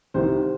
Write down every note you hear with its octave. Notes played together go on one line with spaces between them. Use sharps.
C2 C3 D#3 C5